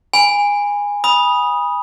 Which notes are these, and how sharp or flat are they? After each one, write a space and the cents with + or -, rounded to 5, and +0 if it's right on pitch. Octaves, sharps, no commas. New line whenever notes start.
G#5 -20 B5 +0
B5 -20 D#6 +0